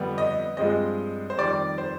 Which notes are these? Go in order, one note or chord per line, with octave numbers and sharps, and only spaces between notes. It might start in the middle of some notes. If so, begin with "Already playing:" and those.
Already playing: F2 D3 G3 B3
D#5
G2 F3 G#3 C4 D#5
C5
F2 D#3 G3 D5
C5